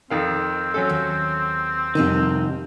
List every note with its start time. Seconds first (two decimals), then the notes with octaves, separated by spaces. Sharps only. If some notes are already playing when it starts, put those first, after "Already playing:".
0.10 F2 D#3 C4 F5
0.74 F#3 C#4 A4
0.89 D#2
1.95 F2 C3 D#3 G3 D#4